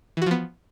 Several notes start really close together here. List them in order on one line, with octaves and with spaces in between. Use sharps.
E3 F#4 F3 B3